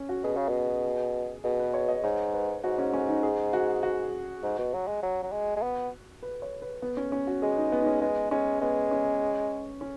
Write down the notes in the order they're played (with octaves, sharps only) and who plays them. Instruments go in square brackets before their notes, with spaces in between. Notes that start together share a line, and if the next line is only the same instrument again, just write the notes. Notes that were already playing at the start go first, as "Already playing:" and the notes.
Already playing: [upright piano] C#4
F#4
[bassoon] B2 [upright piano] G#4
[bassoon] C#3
B2
[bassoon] B2 [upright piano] G#4
[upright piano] B4
C#5
D#5
[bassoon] G#2 [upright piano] C#5
[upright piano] B4
[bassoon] G#2 [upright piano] F#4
[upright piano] C#4
C#4
D#4
G#4
F#4
F#4
[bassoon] G#2
B2
F#3
G#3
F#3
F#3
G#3
G#3
B3
[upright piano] B4
C#5
B4
B3
C#4
C#4
F#4
[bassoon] G#3 [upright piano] G#4
[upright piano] D#4
B3
D#4
C#4
[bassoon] G#3 [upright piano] B3
[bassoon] G#3 [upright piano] C#4
[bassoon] G#3 [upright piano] B3
[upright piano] C#4
C#4